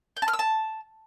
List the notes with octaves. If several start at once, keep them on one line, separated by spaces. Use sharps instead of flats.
G5
A5
F6
E6
A5